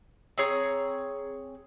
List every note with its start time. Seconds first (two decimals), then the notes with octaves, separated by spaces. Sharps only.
0.38 C4 G#4 C#5 A#5